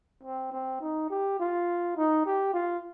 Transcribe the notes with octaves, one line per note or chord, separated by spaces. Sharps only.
C4
C4
D#4
G4
F4
D#4
G4
F4